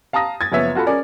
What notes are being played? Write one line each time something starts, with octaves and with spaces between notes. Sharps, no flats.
F5 A5 A#5 D#6 A#6
G#6 A6
F#1 F3 B3 C#5 E5
F4 F#4 A4 A5 B5
C#4 G#4 A#4 D5